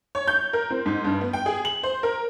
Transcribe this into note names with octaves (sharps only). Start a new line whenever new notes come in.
C#5
G6
A#4
C4
G#2
G2
B3
G5
G#4
F#7
C5
A#4